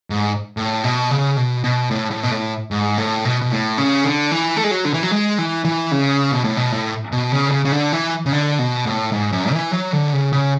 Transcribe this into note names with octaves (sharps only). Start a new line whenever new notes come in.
G#2
A2
B2
C#3
B2
B2
A2
A2
B2
A2
G#2
A2
B2
B2
A2
C#3
D3
E3
A3
G#3
F#3
D3
E3
F#3
G#3
E3
E3
C#3
B2
A2
B2
A2
B2
C#3
D3
C#3
C#3
D3
E3
C#3
D3
B2
A2
G#2
F#2
E3
F#3
D3
C#3
C#3